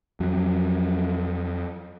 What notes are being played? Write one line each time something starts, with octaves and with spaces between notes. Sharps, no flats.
F2 F#3